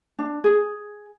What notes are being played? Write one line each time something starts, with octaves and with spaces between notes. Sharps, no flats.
D4
G#4